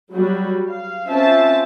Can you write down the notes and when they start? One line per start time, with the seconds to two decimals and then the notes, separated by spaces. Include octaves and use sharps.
0.12 F#3 G3 F#4
0.69 F5
1.07 C4 C#4 F4 C5 E5 A5